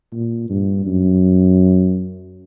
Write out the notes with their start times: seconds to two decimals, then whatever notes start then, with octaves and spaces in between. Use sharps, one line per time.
0.13 A#2
0.50 G2
0.86 F#2